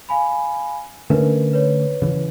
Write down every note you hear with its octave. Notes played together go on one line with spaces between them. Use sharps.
F5 G#5 B5
D3 A3 C#4 A#4 B4
B4 C#5
C#3 E3